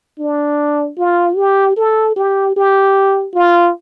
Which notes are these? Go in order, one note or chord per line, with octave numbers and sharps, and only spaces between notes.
D4
F4
G4
A4
G4
G4
F4